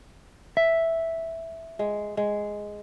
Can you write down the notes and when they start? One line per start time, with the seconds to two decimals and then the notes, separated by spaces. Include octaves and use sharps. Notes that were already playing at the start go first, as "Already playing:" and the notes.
0.57 E5
1.79 G#3
2.17 G#3